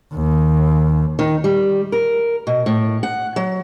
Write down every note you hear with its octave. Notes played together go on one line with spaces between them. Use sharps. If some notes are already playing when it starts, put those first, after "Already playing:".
D#2
D#3
G3
A#4
B2
A2
F#5
F#3